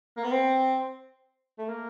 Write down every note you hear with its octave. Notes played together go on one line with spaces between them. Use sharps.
A#3
B3
C4
A3
A#3